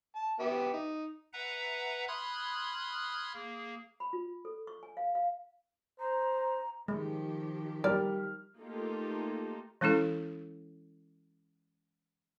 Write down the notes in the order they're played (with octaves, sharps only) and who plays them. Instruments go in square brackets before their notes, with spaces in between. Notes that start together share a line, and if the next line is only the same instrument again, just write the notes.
[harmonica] A5
B3 G4 E5
D#4
[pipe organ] B4 E5 F#5 A#5
B5 C6 D#6 F6 F#6 G#6
A#3 G#4
[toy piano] B5
F4
A4
C#6
G#5
F5
F5
[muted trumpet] C5 [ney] A#5
[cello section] D#3 F3 G4 [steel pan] G#3
[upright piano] G3 F6 [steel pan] A#4 [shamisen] D5
[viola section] A3 A#3 D#4 F4 G4 A4
[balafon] E3 G#3 C#4 E4 A4